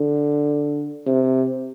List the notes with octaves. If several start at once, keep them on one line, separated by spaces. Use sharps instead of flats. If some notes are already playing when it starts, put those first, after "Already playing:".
Already playing: D3
C3